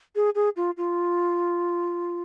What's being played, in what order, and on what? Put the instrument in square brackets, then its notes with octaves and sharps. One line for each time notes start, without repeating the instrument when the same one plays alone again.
[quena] G#4
G#4
F4
F4